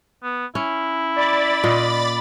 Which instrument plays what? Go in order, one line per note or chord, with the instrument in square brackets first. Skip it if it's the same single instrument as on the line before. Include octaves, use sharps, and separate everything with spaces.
[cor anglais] B3
[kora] C#4 [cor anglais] E4
[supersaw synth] D5 B5 A6
[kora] A#2 D#5